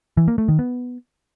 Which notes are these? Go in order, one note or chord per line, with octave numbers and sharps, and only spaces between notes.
E3
A#3
A3
D#3
B3